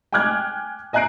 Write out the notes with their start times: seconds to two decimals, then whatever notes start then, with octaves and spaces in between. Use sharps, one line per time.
0.12 G5 G#5 D6 F6 F#6 G#6
0.93 D#5 G#5 A#5 F#6 C7 D7